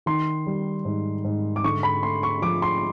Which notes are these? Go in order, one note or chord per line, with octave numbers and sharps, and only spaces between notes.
D#3 C6
G3
G#2
G#2
D6
D3 C#6
B5
A3 C6
C#6
F3 D6
C6